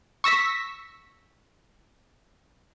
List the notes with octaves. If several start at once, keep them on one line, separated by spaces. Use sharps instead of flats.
C#6 E6 A#6 B6